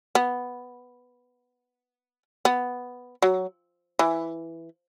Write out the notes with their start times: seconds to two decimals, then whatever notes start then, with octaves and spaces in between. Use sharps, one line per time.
0.15 B3
2.45 B3
3.22 F#3
3.99 E3